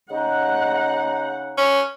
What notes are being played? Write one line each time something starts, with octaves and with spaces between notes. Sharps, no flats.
C#3 D#4 D#5 F#5
C#4